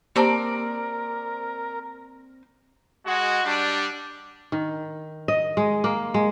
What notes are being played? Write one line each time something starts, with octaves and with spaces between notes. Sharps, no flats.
A#3 C4 G4 A#4 D5 A5 A#5
G#3 F#4
G3 D4
D#3
D#5
G#3
A#3
G#3